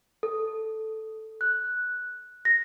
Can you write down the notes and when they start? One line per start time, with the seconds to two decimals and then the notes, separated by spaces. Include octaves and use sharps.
0.23 A4
1.41 F#6
2.45 A#6